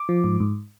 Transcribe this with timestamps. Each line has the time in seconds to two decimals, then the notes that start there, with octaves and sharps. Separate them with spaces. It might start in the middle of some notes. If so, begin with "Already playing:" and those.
Already playing: D6
0.09 F3
0.24 G#2
0.40 G#2